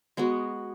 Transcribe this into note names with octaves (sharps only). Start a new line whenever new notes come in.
G#3 B3 F#4